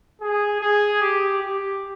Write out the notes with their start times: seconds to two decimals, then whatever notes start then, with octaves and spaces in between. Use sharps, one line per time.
0.21 G#4
0.61 G#4
1.01 G4
1.42 G4